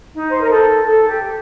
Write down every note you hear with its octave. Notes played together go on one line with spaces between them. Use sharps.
D#4
C5
A#4
A4
A4
G4